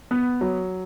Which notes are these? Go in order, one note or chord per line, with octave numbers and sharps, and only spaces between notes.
B3
F#3